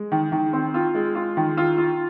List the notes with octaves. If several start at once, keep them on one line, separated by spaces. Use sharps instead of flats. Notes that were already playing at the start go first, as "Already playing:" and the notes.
Already playing: G#3
D#3
D#3
C4
F4
G#3
F4
D#3
F4
F4